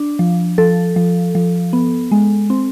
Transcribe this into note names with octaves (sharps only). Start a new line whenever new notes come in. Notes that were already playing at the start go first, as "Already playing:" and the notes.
Already playing: D4
F3
F3 A4
F3
F3
B3
G#3
C4